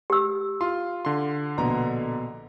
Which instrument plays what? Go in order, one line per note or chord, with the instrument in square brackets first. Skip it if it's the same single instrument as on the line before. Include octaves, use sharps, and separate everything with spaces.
[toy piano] G4 E6
[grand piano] F4 [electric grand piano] C6
[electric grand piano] D3 C6
[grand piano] A#1 B2 A#5